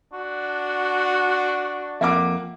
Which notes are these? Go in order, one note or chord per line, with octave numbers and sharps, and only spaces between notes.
D4 F#4
F2 A#3 E5 F#5 D6